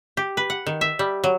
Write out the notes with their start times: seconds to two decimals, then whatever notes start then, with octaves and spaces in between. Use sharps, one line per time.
0.17 G4
0.37 B4
0.50 F#5
0.66 D#3
0.81 E5
0.99 G3
1.24 F#3